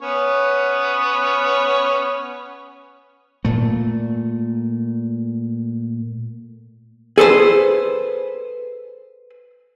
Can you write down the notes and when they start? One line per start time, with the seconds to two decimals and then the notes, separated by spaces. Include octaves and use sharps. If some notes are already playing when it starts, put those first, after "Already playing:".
0.01 B3 C#4 C#5
3.45 A#2 A3
7.18 G#4 A4 B4 C5